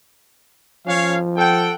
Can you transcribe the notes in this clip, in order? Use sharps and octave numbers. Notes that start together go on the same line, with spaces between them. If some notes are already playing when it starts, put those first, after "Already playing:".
F3 C#4 C#5 F5
A4 F#5 G5